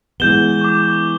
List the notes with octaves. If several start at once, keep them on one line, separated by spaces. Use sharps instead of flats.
E3 G#3 B3 G6 E7 G7
C#6 D6